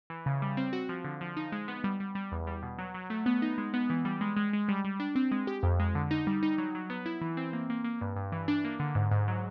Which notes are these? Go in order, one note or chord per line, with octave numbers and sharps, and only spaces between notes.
E3
C#3
G3
C4
F#4
F3
D3
F3
D#4
G#3
B3
G3
G3
G3
E2
G3
B2
F#3
F#3
A3
B3
D#4
G#3
B3
E3
G3
G#3
G#3
G#3
G3
G3
D4
C4
G#3
G4
F2
G#3
D3
D#4
G3
D#4
F#3
F#3
B3
E4
E3
C4
A#3
A#3
A#3
G2
G2
E3
D4
A#3
D3
G#2
G#2
F#3